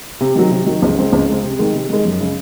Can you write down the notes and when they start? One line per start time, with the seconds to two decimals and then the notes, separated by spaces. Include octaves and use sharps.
0.21 C3
0.35 D#3 F#3
0.51 C3
0.66 D#3 F#3
0.82 C#2
0.97 C#3 G#3 C4
1.13 C#2
1.28 C#3 G#3 C4
1.43 C3
1.59 D#3 G#3
1.74 C3
1.89 D#3 G#3
2.05 F#2
2.20 C#3 G#3